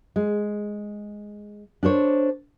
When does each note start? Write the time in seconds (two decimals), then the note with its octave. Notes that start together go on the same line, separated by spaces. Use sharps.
0.16 G#3
1.83 D4 A4 C5 C#5